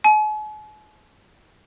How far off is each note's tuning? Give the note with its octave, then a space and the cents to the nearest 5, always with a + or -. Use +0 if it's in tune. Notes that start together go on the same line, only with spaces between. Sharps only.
G#5 +45